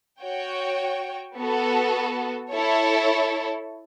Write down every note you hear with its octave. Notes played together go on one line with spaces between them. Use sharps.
F#4 C#5 G5
B3 F#4 A4
E4 A4 C#5